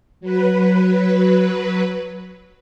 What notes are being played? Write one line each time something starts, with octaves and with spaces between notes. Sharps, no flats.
F#3 B4